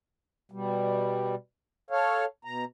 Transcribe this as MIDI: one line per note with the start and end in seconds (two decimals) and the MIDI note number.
0.52 1.35 47
0.52 1.35 55
1.90 2.25 69
1.90 2.25 73
1.90 2.25 77
2.45 2.65 47
2.45 2.65 82